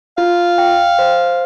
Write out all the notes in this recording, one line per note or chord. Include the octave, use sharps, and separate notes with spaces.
F4 F5
G5
C5